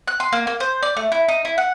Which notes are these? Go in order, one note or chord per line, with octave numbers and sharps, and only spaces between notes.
F#6
C6
A#3
A#3
C5
D5
A3
E4
D#4
E4
F#5